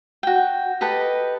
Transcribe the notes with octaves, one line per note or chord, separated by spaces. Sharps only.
F#4 G5
G4 A4 B4 D#5